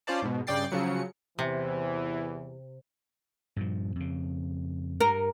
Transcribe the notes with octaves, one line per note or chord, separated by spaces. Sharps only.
C#4 F4 C5 D5 A5
G#2 B2
G2 C#3 D5 G5 A6 C7
C#3 F3 F#3 C#7
E2 C3 E3
G2 A#2 F3
F2 C#3
G2 A#4